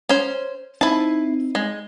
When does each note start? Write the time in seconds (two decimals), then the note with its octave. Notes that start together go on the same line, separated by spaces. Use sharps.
0.09 C#4 C5
0.81 C4 D#4 E4 A5
1.55 G#3